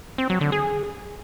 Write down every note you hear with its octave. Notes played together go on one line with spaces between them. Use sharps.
C4
F#3
D3
G#4